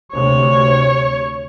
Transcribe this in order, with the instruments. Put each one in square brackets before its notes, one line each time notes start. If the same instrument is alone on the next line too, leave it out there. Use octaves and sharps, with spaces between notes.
[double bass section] D2 C3 [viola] C#5